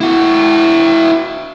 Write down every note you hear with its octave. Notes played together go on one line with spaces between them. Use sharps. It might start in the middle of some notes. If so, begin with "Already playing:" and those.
E4 F#4